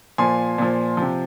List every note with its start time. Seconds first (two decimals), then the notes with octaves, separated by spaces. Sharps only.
0.18 A#2 F3 G#5 C6
0.58 A#2 F3
0.97 C3 F3